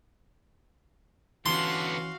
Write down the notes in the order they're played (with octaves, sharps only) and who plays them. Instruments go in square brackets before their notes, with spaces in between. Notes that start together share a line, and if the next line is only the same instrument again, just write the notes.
[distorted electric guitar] D3 B3 [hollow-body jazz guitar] E3 C#4 [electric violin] F#4 F5 [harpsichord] C6